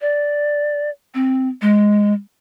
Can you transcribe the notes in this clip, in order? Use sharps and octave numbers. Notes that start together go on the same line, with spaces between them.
D5
C4
G#3